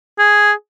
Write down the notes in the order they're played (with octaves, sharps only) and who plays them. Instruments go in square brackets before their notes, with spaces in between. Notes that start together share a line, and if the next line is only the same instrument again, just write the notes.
[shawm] G#4